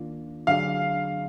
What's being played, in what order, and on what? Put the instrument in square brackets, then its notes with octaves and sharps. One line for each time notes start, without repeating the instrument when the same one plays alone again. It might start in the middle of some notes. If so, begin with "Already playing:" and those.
Already playing: [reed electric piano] D#2 D#3 A#3 D4 F4
[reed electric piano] D3 F#3 D4 G#4 [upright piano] F5